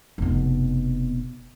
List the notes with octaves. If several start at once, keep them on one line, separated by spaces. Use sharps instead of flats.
F1 B2